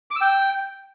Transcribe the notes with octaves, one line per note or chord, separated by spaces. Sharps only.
D6
E6
G5